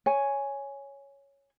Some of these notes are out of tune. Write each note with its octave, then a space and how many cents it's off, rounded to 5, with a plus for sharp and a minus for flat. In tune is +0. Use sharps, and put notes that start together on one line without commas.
C#5 +0 G#5 +0